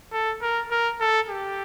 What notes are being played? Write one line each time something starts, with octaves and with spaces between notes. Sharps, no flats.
A4
A#4
A#4
A4
G4